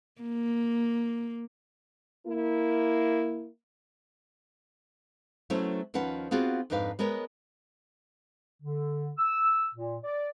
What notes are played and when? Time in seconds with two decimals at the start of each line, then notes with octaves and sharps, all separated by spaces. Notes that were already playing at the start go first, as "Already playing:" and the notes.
0.22 A#3
2.25 A#3 E4
5.50 F#3 A3 B3 C#4 E4 C5
5.94 D#2 F3 C#4 B4 F#5
6.31 B3 C4 F4 F#4 G#4
6.70 F2 G#2 D4 D#4 B4 F5
6.99 G#3 B3 A#4 B4 C#5
8.63 D3
9.18 E6
9.75 A#2
10.04 D5